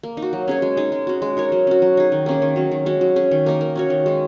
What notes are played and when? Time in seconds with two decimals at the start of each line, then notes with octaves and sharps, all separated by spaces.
0.03 A#3
0.17 D#4
0.22 F#4
0.33 F#3
0.48 C#4 G#4 C#5
0.62 G#3
0.77 D#4 G#4
0.92 G#3
1.07 C#4 F#4
1.22 G#3
1.37 D#4 A#4 C#5
1.52 F#3
1.67 C#4 F#4
1.82 F#3
1.97 D#4 G#4
2.12 D#3
2.26 A#3 C#4 G#4
2.42 D#3
2.56 F#3 C#4
2.71 D#3
2.86 G#3 C#4 F#4
3.01 F#3
3.16 C#4 G#4
3.31 D#3
3.46 A#3 D#4 A#4
3.61 A#3
3.76 C#4 F#4 C#5
3.90 D#3
4.06 G#3 D#4